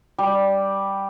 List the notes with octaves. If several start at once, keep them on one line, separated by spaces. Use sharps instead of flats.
G3